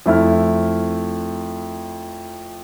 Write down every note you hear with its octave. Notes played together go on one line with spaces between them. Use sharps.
F2 A3 E4 F6